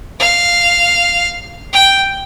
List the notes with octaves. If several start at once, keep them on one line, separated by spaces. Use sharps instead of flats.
F5
G5